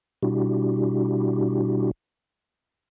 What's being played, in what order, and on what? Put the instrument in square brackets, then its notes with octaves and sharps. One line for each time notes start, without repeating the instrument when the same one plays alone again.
[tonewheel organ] B2 G3 D4 E4 F#4 G4